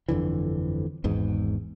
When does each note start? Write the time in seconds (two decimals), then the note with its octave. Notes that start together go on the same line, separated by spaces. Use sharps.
0.09 G1 F2 D3 E3
1.04 G#1 E2 G#2